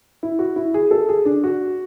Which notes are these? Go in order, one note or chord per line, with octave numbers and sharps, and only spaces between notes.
E4
F#4
E4
G#4
A4
G#4
D4
F#4